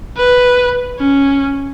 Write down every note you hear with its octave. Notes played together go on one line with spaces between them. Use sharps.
B4
C#4